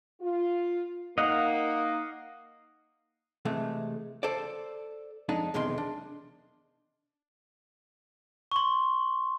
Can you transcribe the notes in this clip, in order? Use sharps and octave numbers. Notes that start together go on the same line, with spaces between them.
F4
A#3 D#4 D#5 F5 F#5
C3 E3 G#3 A3
A4 C5 D5
F2 G#3 D4 D#4
B1 E2 C3 D#3 G#3 C6
D4
C6 C#6